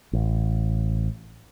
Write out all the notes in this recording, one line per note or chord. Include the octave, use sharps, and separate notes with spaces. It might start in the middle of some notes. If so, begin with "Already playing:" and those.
A1